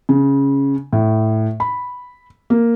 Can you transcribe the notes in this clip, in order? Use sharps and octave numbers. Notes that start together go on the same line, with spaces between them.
C#3
A2
B5
A#3